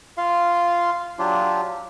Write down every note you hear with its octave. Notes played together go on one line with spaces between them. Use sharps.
F4 F5 C6
F#3 D4 F4 G4